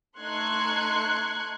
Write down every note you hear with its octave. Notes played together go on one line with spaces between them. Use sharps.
A3 D#4 C6 F#6 G#6 C#7